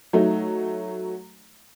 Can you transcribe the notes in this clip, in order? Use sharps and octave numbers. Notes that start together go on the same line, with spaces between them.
F#3 A3 D#4